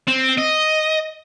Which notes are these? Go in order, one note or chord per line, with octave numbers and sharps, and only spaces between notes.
C4
D#5